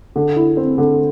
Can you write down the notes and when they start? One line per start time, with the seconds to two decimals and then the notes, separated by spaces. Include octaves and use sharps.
0.16 D3
0.36 E4
0.57 C4
0.78 D3